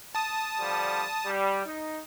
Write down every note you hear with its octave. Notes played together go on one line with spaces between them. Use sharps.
A5 D#6
D3 F3 G3
G3
D#4